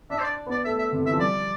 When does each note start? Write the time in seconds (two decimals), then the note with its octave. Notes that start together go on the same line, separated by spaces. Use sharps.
0.10 D4 E5
0.19 C5
0.24 D5
0.46 B3 D5
0.65 A3 E5
0.79 E5
0.92 C3
0.98 D3
1.06 E3 E5
1.13 F3
1.19 G3 D5